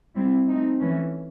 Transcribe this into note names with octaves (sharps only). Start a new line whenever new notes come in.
G3 C4 E4
A3 C4 D#4
E3 A3 C#4